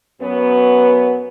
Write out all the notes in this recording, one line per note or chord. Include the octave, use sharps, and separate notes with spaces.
F#2 F#3 B3